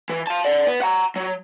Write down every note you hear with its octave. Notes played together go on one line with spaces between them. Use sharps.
E3
F5 A5
D5 F#5
B3
F#5 A#5
F#3